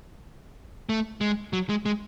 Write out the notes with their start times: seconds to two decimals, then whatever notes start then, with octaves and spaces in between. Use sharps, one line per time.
0.89 A3
1.21 G#3
1.53 F#3
1.69 G#3
1.86 G#3